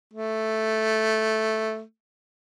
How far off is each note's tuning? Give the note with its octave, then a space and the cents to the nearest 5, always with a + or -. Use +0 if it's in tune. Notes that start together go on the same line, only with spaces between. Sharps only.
A3 -5